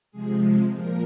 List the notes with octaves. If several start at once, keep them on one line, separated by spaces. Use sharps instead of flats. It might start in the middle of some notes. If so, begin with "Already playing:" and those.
C3 F3 G#3 G#4
A#2 F3 A#4